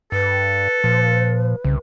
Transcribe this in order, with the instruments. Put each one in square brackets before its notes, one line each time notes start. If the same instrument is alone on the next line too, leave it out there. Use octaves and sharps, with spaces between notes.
[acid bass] G2 [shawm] A4 [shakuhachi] B4
[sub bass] A#2 [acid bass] F3
[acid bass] C2 [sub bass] C#3